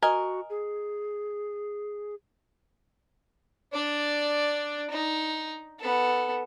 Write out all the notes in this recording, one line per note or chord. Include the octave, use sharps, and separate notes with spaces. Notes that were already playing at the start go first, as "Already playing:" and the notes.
F#4 A#4 D#5 G#5
G#4
D4 D5
D#4
B3 A4